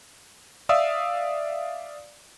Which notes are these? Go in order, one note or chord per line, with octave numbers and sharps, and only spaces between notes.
D5 E5 F5 D#6 E6